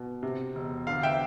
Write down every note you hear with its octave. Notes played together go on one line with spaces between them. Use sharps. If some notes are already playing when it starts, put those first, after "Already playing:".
Already playing: B2
C3
E1
D3 F5
E5 G5